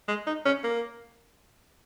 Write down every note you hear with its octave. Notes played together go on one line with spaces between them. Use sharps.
G#3
D#4
C#4
A#3